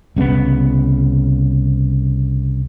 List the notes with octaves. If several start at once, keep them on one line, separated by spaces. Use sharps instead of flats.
C2 C#3 G3 B3